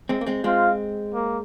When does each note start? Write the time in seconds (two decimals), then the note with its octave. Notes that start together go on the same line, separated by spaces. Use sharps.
0.09 G#3 C4
0.21 A#3
0.27 G#3 C4
0.44 G#3 C4 F4 C5 F5
1.14 A#3